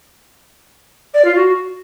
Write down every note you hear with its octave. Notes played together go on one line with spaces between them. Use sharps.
D5
F4
F#4